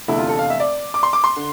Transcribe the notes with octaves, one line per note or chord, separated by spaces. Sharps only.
F1 E2 D3 A3 E4
F4
A4
F5
E5
D5
D6
C6
D6
C6
D3